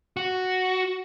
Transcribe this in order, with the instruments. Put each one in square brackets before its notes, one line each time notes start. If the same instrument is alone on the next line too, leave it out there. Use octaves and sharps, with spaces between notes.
[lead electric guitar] F#4